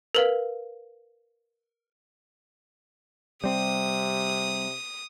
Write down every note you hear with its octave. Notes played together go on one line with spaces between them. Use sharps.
A#4 B4 F5
C3 G3 C4 D#6